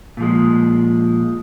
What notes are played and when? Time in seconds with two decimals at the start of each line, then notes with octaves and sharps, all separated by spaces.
0.17 A#2 F3 G#3